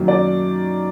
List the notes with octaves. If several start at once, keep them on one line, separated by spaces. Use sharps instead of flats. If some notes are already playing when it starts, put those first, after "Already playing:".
Already playing: F#2 D#3 F#3 A#3
D5